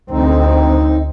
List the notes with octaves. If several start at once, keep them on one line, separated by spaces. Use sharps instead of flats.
D2 C4 D#4